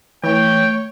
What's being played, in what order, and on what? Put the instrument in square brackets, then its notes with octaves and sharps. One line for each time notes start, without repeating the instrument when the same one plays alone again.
[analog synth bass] E3 [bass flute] A3 [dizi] C#5 [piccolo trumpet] G5